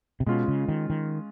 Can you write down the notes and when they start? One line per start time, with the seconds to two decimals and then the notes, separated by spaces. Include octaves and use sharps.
0.20 C3
0.26 B2 G#3 C#4 F4
0.48 C#3
0.68 D#3
0.90 D#3